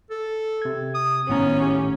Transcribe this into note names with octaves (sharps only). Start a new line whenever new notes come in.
A4
C3 G#6
D#6
G#1 A2 B3 C#4 A#5
G4